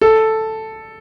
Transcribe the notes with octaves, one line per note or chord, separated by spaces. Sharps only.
A4